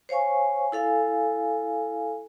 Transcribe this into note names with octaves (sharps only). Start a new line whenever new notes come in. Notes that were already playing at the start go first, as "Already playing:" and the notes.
C5 C#5 F5 G#5 C#6
E4 A4 F5 G#5